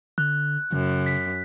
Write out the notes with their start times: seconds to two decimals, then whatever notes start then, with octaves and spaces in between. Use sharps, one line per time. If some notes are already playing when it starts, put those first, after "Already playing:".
0.18 D3 F#6
0.72 F#2 C#3
1.06 B6